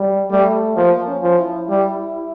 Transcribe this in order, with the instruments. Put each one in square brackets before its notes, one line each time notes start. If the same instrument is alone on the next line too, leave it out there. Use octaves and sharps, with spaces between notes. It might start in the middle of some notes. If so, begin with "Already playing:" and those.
Already playing: [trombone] G3
[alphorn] G3 [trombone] A3
[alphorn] F3 [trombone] A#3
[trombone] C#4
[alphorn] F3
[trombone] E4
[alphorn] G3